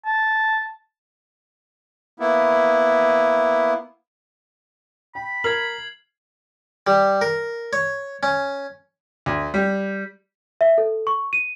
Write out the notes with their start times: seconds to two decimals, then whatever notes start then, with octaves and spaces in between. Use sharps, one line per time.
0.06 A5
2.20 A#3 B3 E4
5.15 G5 B5
5.44 A#4 F6 G#6 C7 F#7
6.87 G3
7.21 A#4
7.73 C#5
8.23 C#4
9.26 D2
9.54 G3
10.61 E5
10.78 A4
11.07 C#6
11.33 D#7